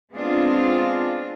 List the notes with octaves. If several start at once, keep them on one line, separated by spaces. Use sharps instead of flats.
G#3 B3 C4 D4 F4 G#4